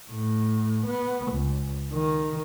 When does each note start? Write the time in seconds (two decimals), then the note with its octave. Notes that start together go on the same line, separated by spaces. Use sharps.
0.11 A2
0.86 B3
1.32 C#2
1.93 D#3